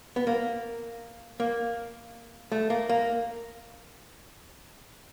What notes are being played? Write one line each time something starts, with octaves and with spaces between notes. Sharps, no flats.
B3
A#3
A#3
A3
A#3
A#3